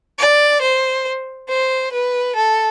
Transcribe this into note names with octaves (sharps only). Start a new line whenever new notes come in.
D5
C5
C5
B4
A4